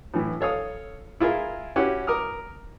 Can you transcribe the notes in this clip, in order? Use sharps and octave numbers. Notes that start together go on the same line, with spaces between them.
A2 E3
A4 C#5 F5 D#6
E4 F4 G#4 A#4 E5
C#4 E4 F#4 G4 F#5
A#4 D6 D#6 F6